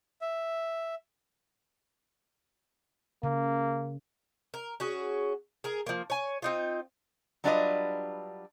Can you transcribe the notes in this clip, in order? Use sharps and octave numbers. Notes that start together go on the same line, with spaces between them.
E5
C#3 A#3
A#4
C#4 F#4 G#4
G#4 A#4
F3 A#3
C#5 G#5
C4 D#4 F4
F#3 G3 D4 F4 B4 D#5